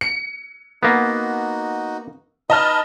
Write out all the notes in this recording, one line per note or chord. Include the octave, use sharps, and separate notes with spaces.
C#7
A#3 B3 D#4 F#4
D#4 B4 D#5 A5 B5 F6